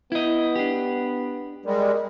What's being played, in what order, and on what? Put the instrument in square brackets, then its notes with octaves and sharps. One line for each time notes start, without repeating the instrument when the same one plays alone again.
[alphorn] B3 [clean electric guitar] E4 D#5
[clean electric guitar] D4 G4
[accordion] G3 G#3 [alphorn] A#4